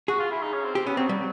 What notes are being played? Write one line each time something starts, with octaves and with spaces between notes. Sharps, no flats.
F#4 G#4
F4
E4
D#4
C#4
C4
C4 G4
B3 C#4
F#3 C4
F#3 G3